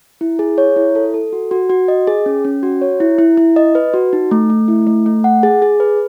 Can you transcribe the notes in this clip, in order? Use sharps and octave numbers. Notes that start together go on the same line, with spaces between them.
E4
G#4
C#5
E4
A4
A4
F#4
F#4
F#4
D#5
G#4
C#4
C#4
F#4
C#5
E4
E4
E4
D#5
B4
F#4
D#4
A3
A3
E4
A3
A3
F#5
G#4
G#4
B4